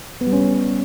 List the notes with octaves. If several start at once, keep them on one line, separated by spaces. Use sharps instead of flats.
B3
G3
C#4